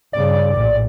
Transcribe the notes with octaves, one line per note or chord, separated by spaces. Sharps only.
G2 C#3 D5
A#1 A2